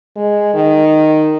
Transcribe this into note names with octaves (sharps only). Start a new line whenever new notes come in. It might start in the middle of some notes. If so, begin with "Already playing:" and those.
G#3
D#3